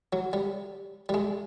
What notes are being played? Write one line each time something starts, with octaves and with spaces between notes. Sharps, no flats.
F#3
G3
G3
G#3